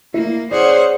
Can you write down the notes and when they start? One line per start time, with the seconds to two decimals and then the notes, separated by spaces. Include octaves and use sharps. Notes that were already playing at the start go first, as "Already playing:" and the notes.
0.14 A#3 E4
0.51 C#4 G#4 C5 D5 F#5